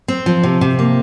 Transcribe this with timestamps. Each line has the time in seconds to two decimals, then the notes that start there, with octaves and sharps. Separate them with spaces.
0.08 C4
0.26 F3
0.43 C3
0.61 C3
0.79 A#3